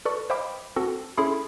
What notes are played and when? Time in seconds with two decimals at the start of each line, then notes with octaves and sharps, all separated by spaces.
0.05 A4 B4 D5 C#6
0.30 C5 D#5 F5 G5 B5 D6
0.76 C4 F#4 A4
1.17 C#4 E4 G#4 A4 C6